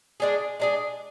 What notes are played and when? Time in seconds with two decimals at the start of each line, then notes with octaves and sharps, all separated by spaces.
0.20 G#3 D4 G#4
0.60 G#3 D4 G#4